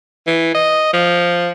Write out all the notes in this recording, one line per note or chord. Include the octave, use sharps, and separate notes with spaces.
E3
D#5
F3